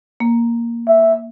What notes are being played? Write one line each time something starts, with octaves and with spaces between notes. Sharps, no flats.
A#3
E5